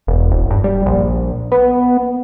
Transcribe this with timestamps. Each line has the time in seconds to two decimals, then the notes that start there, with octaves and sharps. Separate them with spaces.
0.07 E1
0.32 E1
0.51 G2
0.64 G3
0.86 A#1
1.52 B3